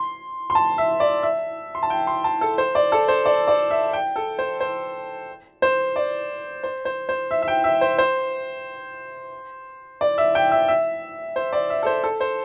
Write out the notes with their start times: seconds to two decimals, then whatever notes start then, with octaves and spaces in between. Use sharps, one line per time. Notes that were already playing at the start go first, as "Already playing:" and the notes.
Already playing: C6
0.50 C6
0.55 A5
0.78 E5
1.00 D5
1.23 E5
1.75 C6
1.83 A5
1.90 G5
2.07 C6
2.24 A5
2.41 A4
2.58 C5
2.75 D5
2.92 A4
3.08 C5
3.26 D5
3.48 D5
3.70 E5
3.93 G5
4.16 A4
4.39 C5
4.60 C5
5.62 C5
5.96 D5
6.63 C5
6.85 C5
7.09 C5
7.31 E5
7.42 E5
7.48 G5
7.64 E5
7.81 C5
7.98 C5
10.01 D5
10.18 E5
10.35 G5
10.51 E5
10.68 E5
11.36 C5
11.53 D5
11.70 E5
11.83 A4
11.86 C5
12.03 A4
12.21 C5